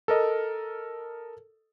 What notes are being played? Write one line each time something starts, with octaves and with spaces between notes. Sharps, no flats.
A4 A#4 D#5